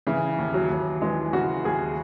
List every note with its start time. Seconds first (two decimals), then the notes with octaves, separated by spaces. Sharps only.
0.07 C#3 E3
0.38 D#2
0.54 F#3
0.70 D#2
1.02 E3 G#3
1.33 C#3 F#4
1.65 D#2 G#4